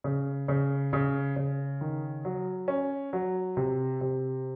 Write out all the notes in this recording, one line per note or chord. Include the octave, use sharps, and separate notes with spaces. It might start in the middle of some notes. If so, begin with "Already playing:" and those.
C#3
C#3
C#3
C#3
D#3
F#3
C#4
F#3
C3
C3